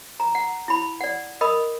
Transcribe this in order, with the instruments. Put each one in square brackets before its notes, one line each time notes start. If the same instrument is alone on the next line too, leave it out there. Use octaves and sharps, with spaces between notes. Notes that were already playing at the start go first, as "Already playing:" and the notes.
[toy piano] A#5
F#5
E4 B5
D5 F#5
A#4 D#5 B5 D#6